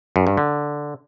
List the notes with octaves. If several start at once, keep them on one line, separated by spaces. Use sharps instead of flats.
F#2
G2
D3